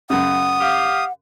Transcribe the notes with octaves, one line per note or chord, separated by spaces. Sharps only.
F#2 C#3 F#5 D#6
G4 F5